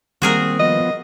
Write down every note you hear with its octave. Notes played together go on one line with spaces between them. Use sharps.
D#3 G3 A#3 C4 F#4 G#4 A#4
F3 B3 D#5